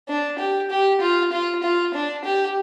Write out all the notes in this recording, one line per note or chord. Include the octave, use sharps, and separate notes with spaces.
D4
G4
G4
F4
F4
F4
D4
G4